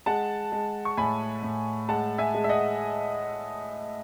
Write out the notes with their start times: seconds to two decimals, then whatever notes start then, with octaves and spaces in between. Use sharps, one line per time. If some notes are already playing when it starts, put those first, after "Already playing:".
0.06 G#3 F#5 A5
0.52 G#3
0.85 C#6
0.97 A2 G#5 B5
1.43 A2
1.88 G#3 F#5 A5
2.18 E5 G#5
2.34 G#3
2.44 E5
2.49 D#5 F#5